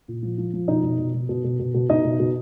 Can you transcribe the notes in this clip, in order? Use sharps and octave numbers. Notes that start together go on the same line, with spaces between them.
A#2
F3
F3
F3
B2 D#4 D#5
B2
B2
B2
B2
B2
B2
B2
B2 D#4 D#5
B2
B2